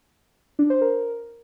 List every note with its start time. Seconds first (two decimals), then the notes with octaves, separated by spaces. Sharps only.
0.59 D4
0.70 C5
0.81 A#4